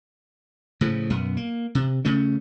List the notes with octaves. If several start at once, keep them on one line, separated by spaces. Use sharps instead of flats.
A2 C#3 F3
B1 F#2 B3
A#3
C3
C#3 A3 C#4